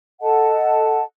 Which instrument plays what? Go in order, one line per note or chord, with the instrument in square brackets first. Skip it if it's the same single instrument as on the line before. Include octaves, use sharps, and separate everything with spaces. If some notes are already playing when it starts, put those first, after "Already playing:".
[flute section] A4 D#5 F#5 A5